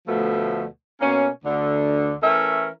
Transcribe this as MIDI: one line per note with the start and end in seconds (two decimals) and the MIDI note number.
0.08 0.64 38
0.08 0.64 47
0.08 0.64 53
0.08 0.64 57
1.01 1.28 47
1.01 1.28 58
1.01 1.28 61
1.45 2.12 38
1.45 2.12 50
2.22 2.66 52
2.22 2.66 57
2.22 2.66 61
2.22 2.66 70
2.22 2.66 76